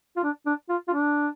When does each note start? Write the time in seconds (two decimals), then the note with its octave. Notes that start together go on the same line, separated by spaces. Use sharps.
0.16 F4
0.23 D4
0.46 D4
0.69 F4
0.88 F4
0.93 D4